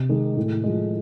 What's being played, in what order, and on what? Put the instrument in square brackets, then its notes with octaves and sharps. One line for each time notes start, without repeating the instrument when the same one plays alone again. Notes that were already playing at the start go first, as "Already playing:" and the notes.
Already playing: [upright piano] C3
D#3 G#3
A2
F3 G#3